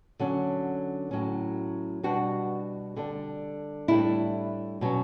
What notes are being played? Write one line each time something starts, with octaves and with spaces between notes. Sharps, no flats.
D3 F#3 C#4
A2 F#3 C#4
B2 G3 D4 F#4
D3 G3 D4
A2 G3 D4 E4
B2 F#3 C#4